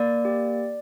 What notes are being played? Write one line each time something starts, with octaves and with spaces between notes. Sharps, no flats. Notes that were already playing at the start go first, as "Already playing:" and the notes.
Already playing: A#3 D5
G4